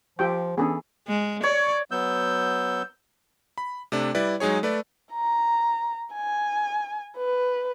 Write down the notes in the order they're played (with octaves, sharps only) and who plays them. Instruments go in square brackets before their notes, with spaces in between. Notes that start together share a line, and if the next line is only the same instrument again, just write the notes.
[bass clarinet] F3 [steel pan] F4 G4 G5 [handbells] C#6 E6
[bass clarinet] E3 [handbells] B3 C#4 D4 [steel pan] G#4 A4
[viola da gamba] G#3
[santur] C#5 [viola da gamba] D5
[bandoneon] F#3 B3 E6 G6
[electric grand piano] B5
C3 A3 D4
G3 E4 B4 D5
F#3 G#3 D#4 G#4 C#5
A3 B4 D5
[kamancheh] A#5
G#5
B4